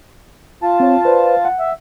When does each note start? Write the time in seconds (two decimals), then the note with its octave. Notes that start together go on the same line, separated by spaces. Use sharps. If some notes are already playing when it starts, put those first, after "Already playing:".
0.63 F4 A5
0.80 C4 C#5
1.05 B4 C5 D5
1.45 F#5
1.59 E5